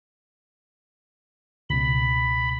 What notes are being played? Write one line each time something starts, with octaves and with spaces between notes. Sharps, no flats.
C#2 B2 B5